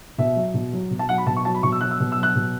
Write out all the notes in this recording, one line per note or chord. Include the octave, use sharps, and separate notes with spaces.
B2 E5
F#3
B2
F#3
B2
A5
F#3 F#5
B5
B2 A5
C#6
F#3 A5
B5
B2 C#6
E6
F#3 F#6
E6
B2
E6
F#3
F#6
B2